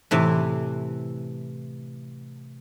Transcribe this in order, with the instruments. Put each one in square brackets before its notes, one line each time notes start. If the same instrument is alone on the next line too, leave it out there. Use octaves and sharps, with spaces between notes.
[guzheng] A2 C3 E3